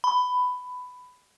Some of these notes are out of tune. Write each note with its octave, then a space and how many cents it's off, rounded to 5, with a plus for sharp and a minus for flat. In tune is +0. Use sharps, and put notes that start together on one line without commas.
B5 +15